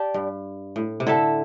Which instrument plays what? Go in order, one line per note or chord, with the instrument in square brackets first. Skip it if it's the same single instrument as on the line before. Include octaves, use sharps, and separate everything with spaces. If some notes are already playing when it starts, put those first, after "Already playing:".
Already playing: [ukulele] G4 D5 A5
[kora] G2
A2
C3
[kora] D3 [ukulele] E4 A4 E5 A5